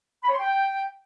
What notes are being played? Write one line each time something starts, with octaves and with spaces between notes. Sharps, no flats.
B5
C#5
C6
G5